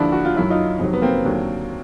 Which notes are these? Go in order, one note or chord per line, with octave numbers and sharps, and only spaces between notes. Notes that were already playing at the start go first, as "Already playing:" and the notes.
Already playing: D#2 D3 F3 D4 E4
F#4
F4
F#2 D#3 F#3 E4
D#4 F4
F2 C3 D#3 F#3
B3
A#3 C4
D#2 D3 F#3